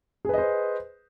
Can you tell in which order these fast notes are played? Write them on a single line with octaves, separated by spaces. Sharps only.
G#4 B4 D#5 C5